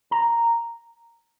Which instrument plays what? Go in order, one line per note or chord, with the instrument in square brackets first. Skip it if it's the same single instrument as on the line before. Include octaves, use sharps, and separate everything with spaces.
[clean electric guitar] A#5